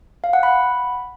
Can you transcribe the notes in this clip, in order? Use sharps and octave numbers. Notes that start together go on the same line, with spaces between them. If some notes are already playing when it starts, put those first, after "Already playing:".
F5
F#5
B5